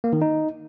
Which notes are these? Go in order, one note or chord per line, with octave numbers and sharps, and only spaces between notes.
A#3
D#3
D#4